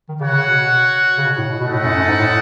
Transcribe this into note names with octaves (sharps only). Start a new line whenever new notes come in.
D#3
C#3 F#4 C#5 F#5
C#3
B2
C#3
B2
A2
B2
B2 A3 D#4 A4 D#5 F#5
A2
F#2
F#2
G#2
A2